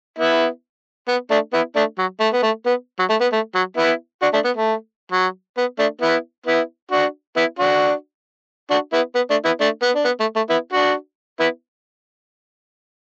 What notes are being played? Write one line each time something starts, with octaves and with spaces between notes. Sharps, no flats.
B3 E4
B3
A3 D4
B3 E4
A3 D4
F#3
A3
B3
A3
B3
F#3
A3
B3
A3
F#3
B3 E4
D4 F#4
A3 D4
B3
A3
F#3
B3
A3 D4
B3 E4
B3 E4
D4 F#4
B3 E4
D4 F#4
D4 F#4
B3 E4
B3
A3 D4
B3 E4
A3 D4
B3
D4
B3
A3
A3
B3 E4
D4 F#4
B3 E4